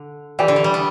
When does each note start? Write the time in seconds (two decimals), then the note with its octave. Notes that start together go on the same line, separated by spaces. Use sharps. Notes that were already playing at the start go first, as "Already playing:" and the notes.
Already playing: D3
0.39 E3 G4 D5 G5
0.48 D3
0.56 E3
0.64 G3
0.74 B3